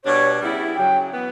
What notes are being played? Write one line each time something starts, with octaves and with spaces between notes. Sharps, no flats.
B2 G3 D4 C#5
C#3 G3 B3 E4
F#2 C#3 F#3 G5
E3 B3